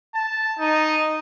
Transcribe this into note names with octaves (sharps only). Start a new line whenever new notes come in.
A5
D#4